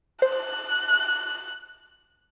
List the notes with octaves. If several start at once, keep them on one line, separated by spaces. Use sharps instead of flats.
C5 F#6